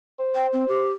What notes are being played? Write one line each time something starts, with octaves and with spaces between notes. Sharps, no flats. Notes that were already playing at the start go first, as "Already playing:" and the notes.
C5
G5
C4
G4